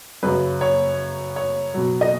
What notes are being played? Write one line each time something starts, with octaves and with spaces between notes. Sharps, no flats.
F#2 C#3 F#3 B4
C#5
C#5
B2 F#3
D#5